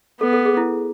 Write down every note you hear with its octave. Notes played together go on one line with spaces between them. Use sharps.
B3 A4
A4
G#4
E4